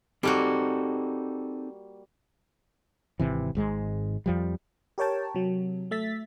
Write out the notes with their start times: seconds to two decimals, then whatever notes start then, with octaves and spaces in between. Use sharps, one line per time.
0.23 G3 A#3 C4 D#4 F#4 A4
3.20 G#1 C3 E3
3.55 G#1 G#2 G#3
4.26 F2 F3 G3
4.98 G4 A#4 C#5 G5 A5
5.34 C3 F#3
5.91 A3 E5 A6 B6